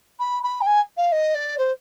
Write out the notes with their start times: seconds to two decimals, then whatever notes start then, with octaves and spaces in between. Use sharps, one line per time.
0.20 B5
0.44 B5
0.61 G5
0.67 G#5
0.97 F5
1.12 D#5
1.35 D5
1.58 C5